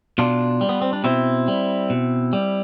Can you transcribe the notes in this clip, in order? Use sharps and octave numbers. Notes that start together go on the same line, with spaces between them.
B2 D4 F4
G3
B3
C4
D4
B2 C4 E4
G3
B2
G3